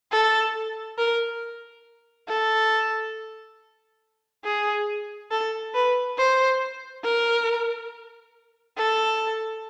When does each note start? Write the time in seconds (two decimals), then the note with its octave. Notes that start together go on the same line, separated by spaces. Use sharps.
0.12 A4
0.98 A#4
2.29 A4
4.44 G#4
5.31 A4
5.74 B4
6.18 C5
7.04 A#4
8.78 A4